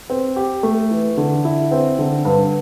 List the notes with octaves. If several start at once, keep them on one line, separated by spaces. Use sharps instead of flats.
C4
G4
A3
E3
D3
E4
C4
D3
G2